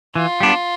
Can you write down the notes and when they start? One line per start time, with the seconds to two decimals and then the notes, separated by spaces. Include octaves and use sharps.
0.15 E3 F4
0.41 G3 B3 D4